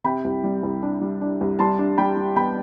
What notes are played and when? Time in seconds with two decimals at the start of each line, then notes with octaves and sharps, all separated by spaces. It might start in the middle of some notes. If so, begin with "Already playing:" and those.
0.04 C3 G5 B5
0.24 C2
0.44 G3
0.63 C2
0.82 D4
1.01 G3
1.21 D4
1.41 C2
1.59 G3 A5 C6
1.79 D4
1.98 G3 G5 B5
2.17 G3
2.36 B2 G5 B5